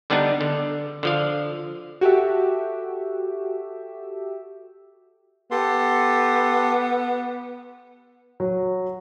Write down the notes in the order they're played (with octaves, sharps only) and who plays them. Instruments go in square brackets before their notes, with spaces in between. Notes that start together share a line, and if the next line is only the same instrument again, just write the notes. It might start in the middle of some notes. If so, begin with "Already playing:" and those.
[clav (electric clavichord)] D3 G3 B3 D4 D#4
D3
D3 F3 F5
[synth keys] F#4 G4 A4 E5
[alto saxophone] B3 [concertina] G4 A4 C6
[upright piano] F#3